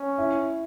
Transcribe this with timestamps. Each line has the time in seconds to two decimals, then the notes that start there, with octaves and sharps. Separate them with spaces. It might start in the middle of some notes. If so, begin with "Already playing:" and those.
Already playing: C#4
0.18 E4